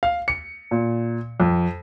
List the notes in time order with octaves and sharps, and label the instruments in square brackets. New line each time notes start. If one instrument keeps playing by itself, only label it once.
[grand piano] F5
C#7
A#2
F2